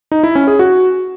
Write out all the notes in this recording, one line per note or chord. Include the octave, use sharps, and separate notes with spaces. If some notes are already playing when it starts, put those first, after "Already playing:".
D#4
E4
C#4
G#4
F#4